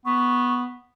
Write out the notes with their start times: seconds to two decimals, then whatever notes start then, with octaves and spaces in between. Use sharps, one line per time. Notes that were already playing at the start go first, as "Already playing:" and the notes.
0.05 B3 C#6